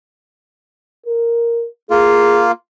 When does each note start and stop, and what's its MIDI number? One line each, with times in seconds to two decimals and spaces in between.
1.06 1.67 70
1.90 2.52 58
1.90 2.52 65
1.90 2.44 68